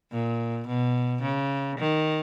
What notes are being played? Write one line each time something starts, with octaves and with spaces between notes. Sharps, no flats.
A#2
B2
C#3
D#3